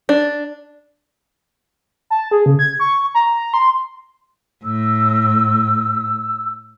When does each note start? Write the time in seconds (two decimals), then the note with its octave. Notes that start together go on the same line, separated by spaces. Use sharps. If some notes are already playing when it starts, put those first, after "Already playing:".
0.09 D4
2.10 A5
2.31 G#4
2.46 C#3
2.59 G#6
2.80 C#6
3.14 A#5
3.54 C6
4.64 A2 E6